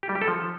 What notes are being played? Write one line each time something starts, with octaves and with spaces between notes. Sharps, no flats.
G4
G3
G4
A4
F3